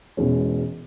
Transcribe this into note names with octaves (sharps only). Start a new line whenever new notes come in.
E1 E2 B2 G#3 C#4